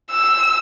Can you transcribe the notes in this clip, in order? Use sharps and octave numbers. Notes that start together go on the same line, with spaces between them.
E6